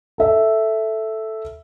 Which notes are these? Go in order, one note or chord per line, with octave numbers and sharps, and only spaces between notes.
A4 E5